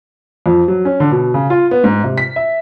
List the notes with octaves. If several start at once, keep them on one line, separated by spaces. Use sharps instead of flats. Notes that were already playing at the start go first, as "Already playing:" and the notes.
F2
F#3
C#4
D3
B2
C#3
F4
B3
G#2
C3
B6
E5